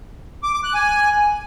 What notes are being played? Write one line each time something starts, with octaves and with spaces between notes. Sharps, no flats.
D6
D6
F#6
G#5